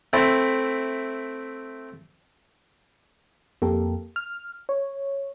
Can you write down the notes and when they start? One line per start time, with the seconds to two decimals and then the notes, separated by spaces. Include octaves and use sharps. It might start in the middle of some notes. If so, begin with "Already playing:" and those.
0.13 A3 C4 E4
3.62 F2 A#3 G4 A4 A#4
4.16 F6
4.69 C#5